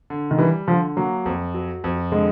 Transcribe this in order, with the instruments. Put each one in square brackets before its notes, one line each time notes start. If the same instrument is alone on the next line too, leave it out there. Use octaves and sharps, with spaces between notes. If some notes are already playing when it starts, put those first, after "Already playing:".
[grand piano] D3
[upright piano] D#3
[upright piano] E3 [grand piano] G3
[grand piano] D3 [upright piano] F3
[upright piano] F#3 [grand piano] A#3
[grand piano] F2
F#3
F2
[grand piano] D3 [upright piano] G#3